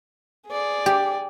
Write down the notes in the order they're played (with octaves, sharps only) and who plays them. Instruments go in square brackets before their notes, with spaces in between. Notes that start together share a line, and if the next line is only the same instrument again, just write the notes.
[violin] G#4 D5
[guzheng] G4